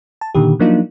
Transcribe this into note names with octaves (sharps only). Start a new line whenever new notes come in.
A5
A#2 D3 D#3 G4
F3 F#3 A#3 D4 D#4 F4